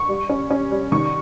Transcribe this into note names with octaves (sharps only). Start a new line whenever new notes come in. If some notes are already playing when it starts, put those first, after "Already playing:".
Already playing: C#6
G3
C#4
C#4
G3
D#3 C#6